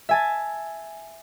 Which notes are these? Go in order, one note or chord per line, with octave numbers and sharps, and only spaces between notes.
E5 G#5 A5